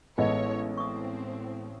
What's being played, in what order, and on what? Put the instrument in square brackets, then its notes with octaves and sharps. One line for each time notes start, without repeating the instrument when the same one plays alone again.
[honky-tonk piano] A1 [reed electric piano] G#3 B3 A4 [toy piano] D#4 D#5 [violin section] C#5
[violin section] C4 [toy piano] C#6 D#6